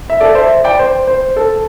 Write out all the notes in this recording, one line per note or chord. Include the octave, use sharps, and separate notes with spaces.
E5
A4 D5
C5 E5
D5 G5
C5
C5
A4